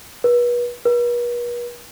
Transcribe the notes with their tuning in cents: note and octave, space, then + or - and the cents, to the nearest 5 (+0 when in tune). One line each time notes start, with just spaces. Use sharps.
B4 -35
B4 -45